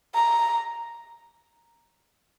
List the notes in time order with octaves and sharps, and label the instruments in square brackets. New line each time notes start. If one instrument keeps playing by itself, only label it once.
[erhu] A#5